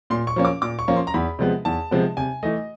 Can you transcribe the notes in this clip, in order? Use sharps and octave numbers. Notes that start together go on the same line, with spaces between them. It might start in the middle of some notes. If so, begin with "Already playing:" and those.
A#2 C6
C#6
F3 A#3 C#4
D6
A#2 D6
C#6
F3 A#3 C#4
C6
A#5
E2 B5
C3 F3 G#3 B3
E2 A5
C3 F3 G#3 B3
C3 G#5
E3 A3 D#5